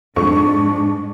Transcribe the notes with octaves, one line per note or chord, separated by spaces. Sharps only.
F2 G#2 D4 C#6